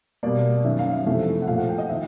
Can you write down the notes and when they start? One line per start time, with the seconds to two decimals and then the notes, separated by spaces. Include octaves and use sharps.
0.23 B2 G3 A#3 D5
0.64 F#2 D#3 F#3 E5
0.79 F5
0.92 E5
1.06 F2 C3 E3 A3
1.42 F#5
1.47 A#2 F3 A3 F5
1.58 F#5
1.69 G5
1.78 D#5
1.89 D#3 E5